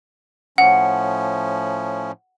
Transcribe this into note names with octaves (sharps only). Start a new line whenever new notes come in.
A2 F3 C#4 F#5